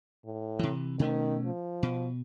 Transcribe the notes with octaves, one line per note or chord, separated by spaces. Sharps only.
A2
C3 E3
B2 D#3 A3 C#4
F3
B2